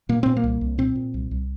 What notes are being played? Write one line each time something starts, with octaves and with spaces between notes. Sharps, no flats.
A#2 A#3
A#2 C4
A#3
C2
C2
A#2 C4
A#2
C2
C2